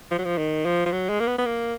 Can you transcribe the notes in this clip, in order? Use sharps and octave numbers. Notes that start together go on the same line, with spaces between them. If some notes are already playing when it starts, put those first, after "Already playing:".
F3
F#3
F3
D#3
F3
F3
F#3
G#3
A#3
B3
B3
A#3